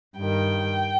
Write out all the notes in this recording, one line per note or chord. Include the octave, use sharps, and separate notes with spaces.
G2 D#3 G5